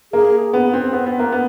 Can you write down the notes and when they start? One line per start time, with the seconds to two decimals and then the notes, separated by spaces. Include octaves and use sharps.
0.13 A#3 G#4
0.53 B3
0.73 C4
0.93 B3
1.06 B3
1.19 A#3
1.32 B3